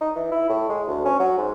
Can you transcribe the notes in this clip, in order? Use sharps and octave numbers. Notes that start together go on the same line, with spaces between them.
D#4
E3
E4
A2
G#3
D2
C#4
F#3
G#2